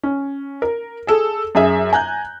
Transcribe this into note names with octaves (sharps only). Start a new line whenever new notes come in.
C#4
A#4
G#4 A4
F#2 G#4 E5
G#5 A#5 F#6 G6